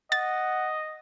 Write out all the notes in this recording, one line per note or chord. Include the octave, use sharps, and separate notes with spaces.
D#5 F#5 A6